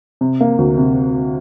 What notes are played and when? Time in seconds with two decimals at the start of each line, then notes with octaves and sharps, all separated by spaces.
0.21 C3
0.41 A#3
0.58 D2
0.78 C3